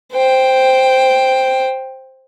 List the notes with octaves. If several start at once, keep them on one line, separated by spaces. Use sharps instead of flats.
C5 G5